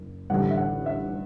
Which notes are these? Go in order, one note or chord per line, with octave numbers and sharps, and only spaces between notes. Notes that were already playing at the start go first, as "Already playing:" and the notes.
Already playing: F#1
A1 G2 D3 G3 F#5
E5
F#5
E5